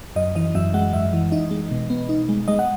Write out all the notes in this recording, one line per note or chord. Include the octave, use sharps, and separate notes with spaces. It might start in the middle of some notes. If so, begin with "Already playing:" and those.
F#2 D#5
E3 D#5
F#2 E5
G#3 F#5
F#2 E5
E3
D#4 D#5
G#3
B2
B3
D#4
G#3
G#3 D#5
F#5